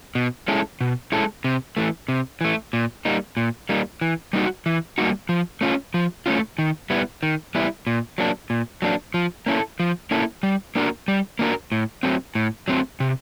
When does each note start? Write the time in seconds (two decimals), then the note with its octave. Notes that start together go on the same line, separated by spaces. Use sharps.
0.15 B2
0.48 G#3 C#4 E4 A4
0.81 B2
1.12 G#3 C#4 E4 A4
1.44 C3
1.77 E3 A3
2.08 C3
2.41 E3 A3
2.73 A#2
3.05 G3 A#3 D#4
3.37 A#2
3.69 G3 A#3 D#4
4.01 E3
4.33 G3 A#3 D#4 F#4
4.66 E3
4.98 G3 A#3 D#4 F#4
5.29 F3
5.61 A3 C#4 F4
5.94 F3
6.26 A3 C#4 F4
6.58 D#3
6.90 G3 B3 E4
7.23 D#3
7.55 G3 B3 E4
7.87 A#2
8.18 F#3 A#3 D4
8.50 A#2
8.82 F#3 A#3 D4
9.14 F3
9.46 A#3 C#4 E4 A4
9.80 F3
10.11 A#3 C#4 E4 A4
10.43 G3
10.75 A#3 D4 F#4 A#4
11.08 G3
11.39 A#3 D4 F#4 A#4
11.72 A2
12.03 F#3 A3 C4
12.35 A2
12.68 F#3 A3 C4
13.00 C3